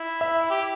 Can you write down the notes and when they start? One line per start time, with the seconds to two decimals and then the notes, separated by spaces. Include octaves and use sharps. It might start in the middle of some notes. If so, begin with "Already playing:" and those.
Already playing: E4
0.21 E5
0.50 G4